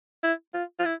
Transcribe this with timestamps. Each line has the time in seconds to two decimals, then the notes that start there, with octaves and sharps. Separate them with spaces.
0.23 E4
0.54 F4
0.79 F4
0.85 E4